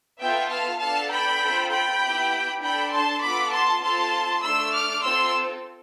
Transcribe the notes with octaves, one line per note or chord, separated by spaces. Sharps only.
B3 F4 A4 E5 G5
F5 A5
B3 D4 A4 F5 A5
G5 B5
C4 F4 A4
G5 B5
B3 E4 G4
D4 A4 G5 B5
A5 C6
B3 F4 A4 B5 D6
A5 C6
C4 F4 A4 A5 C6
A3 D4 A4 C6 E6
D6 F6
C4 F4 A4 C6 E6